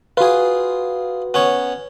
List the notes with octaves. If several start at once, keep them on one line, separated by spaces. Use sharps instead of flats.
F4 F#4 G#4 B4
B3 C#4 C#5